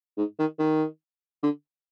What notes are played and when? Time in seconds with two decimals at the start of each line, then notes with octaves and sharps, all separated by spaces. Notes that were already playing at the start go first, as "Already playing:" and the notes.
0.17 G#2
0.39 D#3
0.59 D#3
1.43 D3